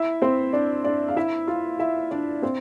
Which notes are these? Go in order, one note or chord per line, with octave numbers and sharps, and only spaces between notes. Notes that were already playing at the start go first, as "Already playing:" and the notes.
Already playing: E4 E5
C4 C5
D4 D5
D4 D5
F5
E4 E5
F4 F5
E4 E5
D4 D5
C4 C5